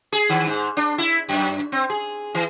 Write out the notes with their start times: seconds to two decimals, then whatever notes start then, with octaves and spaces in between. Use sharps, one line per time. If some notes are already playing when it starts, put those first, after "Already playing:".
0.12 G#4
0.29 D#3
0.47 G#2
0.77 D4
0.98 E4
1.29 F#2
1.72 C4
1.90 G#4
2.35 E3